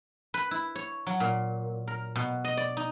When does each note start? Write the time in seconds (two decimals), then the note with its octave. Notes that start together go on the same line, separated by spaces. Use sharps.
0.34 B4
0.51 E4
0.75 C#5
1.07 F#3
1.20 A#2
1.87 A#4
2.16 B2
2.44 D#5
2.57 D5
2.77 D#4